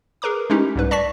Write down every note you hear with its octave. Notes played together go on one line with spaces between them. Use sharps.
G#4 A#4 B4 A#5 D6
G#3 A3 C#4 D#4 E4 G4
C2 G#2 B4
D5 A5 C#6 A#6 B6